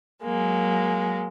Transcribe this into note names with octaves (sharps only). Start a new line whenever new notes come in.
F#3 G#3 A#3